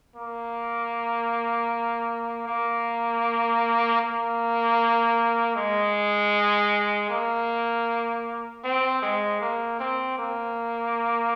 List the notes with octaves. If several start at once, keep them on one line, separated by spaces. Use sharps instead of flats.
A#3
A#3
A#3
G#3
A#3
C4
G#3
A#3
C4
A#3